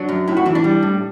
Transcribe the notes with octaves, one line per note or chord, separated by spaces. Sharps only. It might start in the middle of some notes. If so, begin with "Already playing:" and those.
Already playing: F#3 D4
F#2
A2 E4
F#4
E3 E4
D4
G3
A2